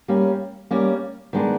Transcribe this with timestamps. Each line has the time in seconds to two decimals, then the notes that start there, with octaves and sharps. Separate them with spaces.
0.08 G3 A#3 C#4
0.71 G3 A#3 C#4
1.33 D#3 G#3 B3 D4